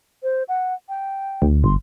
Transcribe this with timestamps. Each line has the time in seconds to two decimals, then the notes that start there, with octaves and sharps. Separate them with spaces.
0.23 C5
0.48 F#5
0.89 G5
1.42 D2
1.64 G1 C6